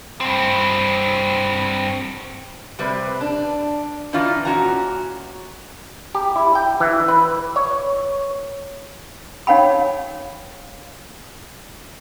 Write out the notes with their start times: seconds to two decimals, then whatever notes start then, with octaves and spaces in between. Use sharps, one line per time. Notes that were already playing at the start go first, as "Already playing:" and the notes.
0.21 G2 C4
2.79 C3 G3 C4 B4
3.21 D4
4.13 D#3 E3 D4 D#4 F4
4.45 A#2 C#4 F#4 A#5
6.15 G4
6.36 E4
6.55 G5
6.80 E3
7.08 B4
7.56 C#5
9.47 D#4 C#5 F5 G5 B5